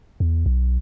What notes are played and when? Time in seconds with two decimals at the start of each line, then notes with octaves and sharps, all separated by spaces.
0.20 E2
0.46 B1